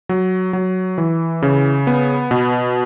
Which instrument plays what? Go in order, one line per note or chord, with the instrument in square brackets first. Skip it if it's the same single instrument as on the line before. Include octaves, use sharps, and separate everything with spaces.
[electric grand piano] F#3
F#3
E3
C#3
B3
B2